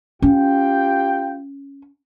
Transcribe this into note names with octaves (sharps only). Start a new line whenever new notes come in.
C#4 F4 G4 G5